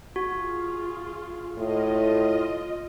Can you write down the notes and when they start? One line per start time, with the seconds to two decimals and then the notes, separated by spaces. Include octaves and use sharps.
0.16 F4 F#4 G#4
1.58 A2 F4 D#5